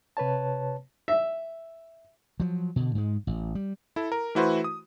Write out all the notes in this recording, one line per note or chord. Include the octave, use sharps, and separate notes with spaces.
C3 B4 C#5 A5
E5
F3 F#3
B2 D3
G#2 G#3
A1
G3
E4 A4
A#4
E3 A3 E4 F#4 B4 C5
D#6